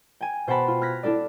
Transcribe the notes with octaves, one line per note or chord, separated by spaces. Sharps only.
G5 G#5
B2 C5 F#5 G5 A5 B5
F4
F6 F#6 G#6 A#6 B6
D4 E4 A4 D5